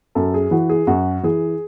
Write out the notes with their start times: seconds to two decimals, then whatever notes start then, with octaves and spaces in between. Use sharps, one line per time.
0.15 F#2 A4
0.34 G#4
0.51 E3 F#4
0.70 G#4
0.87 F#2 F#4
1.23 E3 G#4